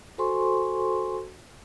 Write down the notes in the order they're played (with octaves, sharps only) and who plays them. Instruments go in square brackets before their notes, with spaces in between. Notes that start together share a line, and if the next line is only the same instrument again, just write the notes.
[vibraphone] F#4 A4 C5 G#5 C6 C#6